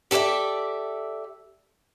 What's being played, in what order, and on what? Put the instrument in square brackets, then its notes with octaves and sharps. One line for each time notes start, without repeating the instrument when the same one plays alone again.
[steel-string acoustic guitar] G4 A4 B4 D5 E5